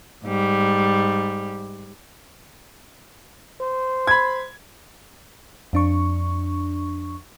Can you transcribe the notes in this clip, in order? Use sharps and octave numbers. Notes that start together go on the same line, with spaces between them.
G#2 G3
C5
B5 G#6
F2 D4 C#6